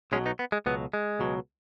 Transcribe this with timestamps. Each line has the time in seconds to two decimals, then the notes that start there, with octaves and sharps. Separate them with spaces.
0.12 B1 B2 F#3 G#3 C#4
0.26 B3 D#4
0.39 B3
0.52 G#3
0.66 C#2 B2 F#3 B3
0.93 G#3
1.19 C#2 B2 F#3